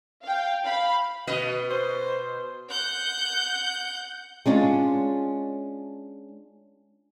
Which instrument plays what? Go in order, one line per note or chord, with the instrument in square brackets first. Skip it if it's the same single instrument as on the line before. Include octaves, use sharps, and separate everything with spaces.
[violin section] F5 G5
F5 B5
[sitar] B2 B4 D#5
[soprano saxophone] C5
[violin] F#5 G6
[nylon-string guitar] G#3 C#4 D4 F4